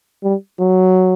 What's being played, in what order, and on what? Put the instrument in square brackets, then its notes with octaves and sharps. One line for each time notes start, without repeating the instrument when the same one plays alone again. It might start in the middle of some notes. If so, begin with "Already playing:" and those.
[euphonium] G3
F#3